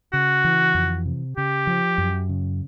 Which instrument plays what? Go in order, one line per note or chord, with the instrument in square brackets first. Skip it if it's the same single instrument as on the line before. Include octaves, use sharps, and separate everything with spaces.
[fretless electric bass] C#3 [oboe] F#4
[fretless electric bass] E3
F2
C3
[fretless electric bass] C#3 [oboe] G4
[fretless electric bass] F3
F#2
C#3